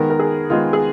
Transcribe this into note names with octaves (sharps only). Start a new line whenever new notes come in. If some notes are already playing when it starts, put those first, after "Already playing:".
Already playing: D#3 G#3 B3 A#4
A#4
G#4
D#3 G#3 B3 F4
G#4